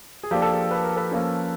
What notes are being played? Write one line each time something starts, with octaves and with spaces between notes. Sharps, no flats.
G#4
F3 A#3 D4 G4 A4
A4
G#4
B4
A#4
A4 B4
F3 A#3 C#4